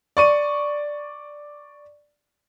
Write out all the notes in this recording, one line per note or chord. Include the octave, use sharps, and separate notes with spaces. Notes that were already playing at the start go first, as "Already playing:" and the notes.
D5 C#6 D#7